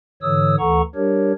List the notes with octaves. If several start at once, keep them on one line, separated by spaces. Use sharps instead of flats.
G#2 D3 E3 C#5 D#6 E6
D2 E3 A4 F#5 A#5 C#6
G3 D4 G4 A#4 C#5